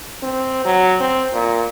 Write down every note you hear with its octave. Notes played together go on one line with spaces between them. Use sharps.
C4
F#3
C4
A#2